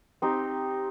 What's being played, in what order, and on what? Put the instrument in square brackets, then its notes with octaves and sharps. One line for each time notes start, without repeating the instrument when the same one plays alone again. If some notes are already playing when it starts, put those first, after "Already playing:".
[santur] C4 D#4 G4